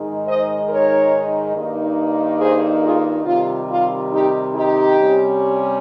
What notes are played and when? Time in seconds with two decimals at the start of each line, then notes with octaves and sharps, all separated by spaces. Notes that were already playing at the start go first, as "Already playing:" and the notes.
Already playing: G#2 D#3 G#3 D#4
0.25 C5 D#5
0.68 A#4 C#5
1.55 G2 D#3 A#3 D#4
2.40 G#4 C5
2.82 F4 G#4
3.25 C3 D#3 G3 F4
3.68 F4
4.11 D#4 G4
4.53 D#4 G4
4.97 C3 G3 C#4